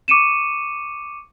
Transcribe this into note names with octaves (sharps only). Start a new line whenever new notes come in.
C#6 D6 C#7 D#7 E7